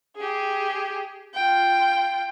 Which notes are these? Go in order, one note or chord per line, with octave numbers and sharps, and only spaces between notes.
G4 G#4
F4 G5